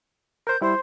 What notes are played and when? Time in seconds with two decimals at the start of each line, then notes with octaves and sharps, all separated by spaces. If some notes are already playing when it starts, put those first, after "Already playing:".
0.47 A#4 C5 G6
0.62 G3 E4 C5